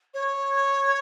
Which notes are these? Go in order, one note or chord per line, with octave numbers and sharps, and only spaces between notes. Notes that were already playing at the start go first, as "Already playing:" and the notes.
C#5